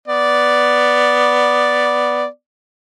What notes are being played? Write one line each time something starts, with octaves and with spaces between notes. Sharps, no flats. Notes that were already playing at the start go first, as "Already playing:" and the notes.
B3 D5